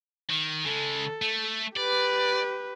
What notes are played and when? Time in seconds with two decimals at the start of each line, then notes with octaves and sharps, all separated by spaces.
0.30 D#3
0.65 C#3 G#3 A4
1.22 A3
1.76 G4 B4 D5